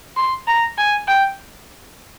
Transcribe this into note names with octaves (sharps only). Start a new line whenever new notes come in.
C6
A#5
G#5
G5